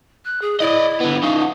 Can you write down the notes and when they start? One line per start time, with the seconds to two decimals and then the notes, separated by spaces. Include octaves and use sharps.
0.25 F#6
0.42 G#4
0.60 E4 D5 D#5
1.00 D3 B3
1.23 C#4 D#4 F5
1.40 F#5